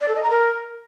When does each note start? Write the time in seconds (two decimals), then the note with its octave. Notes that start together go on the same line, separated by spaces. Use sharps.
0.01 D5
0.08 A4
0.16 D#5
0.23 A#5
0.30 A#4